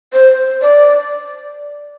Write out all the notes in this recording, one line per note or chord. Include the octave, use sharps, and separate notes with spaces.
C5
D5